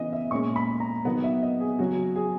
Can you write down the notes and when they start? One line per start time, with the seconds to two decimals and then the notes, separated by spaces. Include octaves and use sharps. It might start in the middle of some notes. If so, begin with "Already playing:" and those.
Already playing: C#3 E3 B3 D#5
0.12 E5
0.31 A#2 G#3 C#4 C#6
0.56 B5
0.80 A#5
1.05 D#3 F#3 B3 F#5
1.24 E5
1.43 D#5
1.60 G#4
1.79 C#3 F#3 C#4 F#4
2.16 G#4